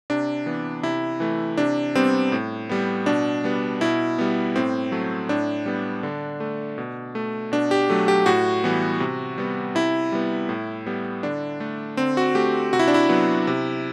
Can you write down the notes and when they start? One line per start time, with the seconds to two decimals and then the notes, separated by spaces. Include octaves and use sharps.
0.10 C3 D4
0.46 E3 B3
0.83 C3 E4
1.20 E3 A3
1.57 C3 D4
1.95 G3 B3 C4
2.32 A2
2.69 G3 B3
3.06 B2 D4
3.44 G3 B3
3.81 B2 E4
4.18 G3 B3
4.55 A2 C4
4.92 F#3 A3
5.29 A2 D4
5.66 G3 B3
6.03 D3
6.40 A3
6.78 B2
7.15 A3
7.52 B2 D4
7.71 G4
7.90 F#3 A3
8.08 G4
8.26 A2 F#4
8.64 E3 G3 B3
9.00 C3
9.38 G3 B3
9.75 C3 E4
10.12 G3 B3
10.49 A2
10.86 G3 B3
11.23 D3 D4
11.60 A3
11.97 D3 C4
12.17 F#4
12.35 A3 G4
12.73 C3 F#4
12.79 E4
12.88 D4
12.94 E4
13.09 F#3 B3
13.47 C3